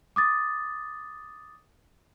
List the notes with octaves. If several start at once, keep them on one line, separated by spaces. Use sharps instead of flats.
D6 D#6 A6